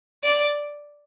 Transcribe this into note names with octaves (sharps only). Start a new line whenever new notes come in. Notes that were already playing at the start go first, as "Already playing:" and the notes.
D5